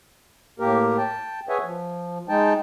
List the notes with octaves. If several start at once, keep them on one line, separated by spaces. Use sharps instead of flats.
A2 A#3 G4 A#4
G5 A5
G#4 B4 C#5 E5 F#5 G#5
F3
G#3 D#4 G5 A5